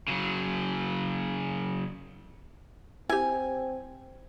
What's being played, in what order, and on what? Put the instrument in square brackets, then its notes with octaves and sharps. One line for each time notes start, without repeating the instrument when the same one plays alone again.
[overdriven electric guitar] C#3 F#3
[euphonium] C4 [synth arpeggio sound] E4 G4 [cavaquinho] G#5